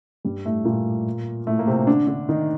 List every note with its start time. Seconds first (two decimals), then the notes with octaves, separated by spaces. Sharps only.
0.25 G2 G3
0.45 A2 A3
0.65 A#2 A#3
1.47 A2 A3
1.59 A#3
1.67 C3 C4
1.87 D3 D4
2.07 D3 D4
2.29 D#3 D#4